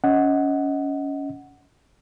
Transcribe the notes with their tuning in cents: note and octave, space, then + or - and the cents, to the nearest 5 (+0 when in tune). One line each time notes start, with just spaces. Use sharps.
C#4 +20 D#5 +25 F#5 +0